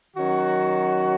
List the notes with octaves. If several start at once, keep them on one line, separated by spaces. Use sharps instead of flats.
D#3 F#3 C#4 F#4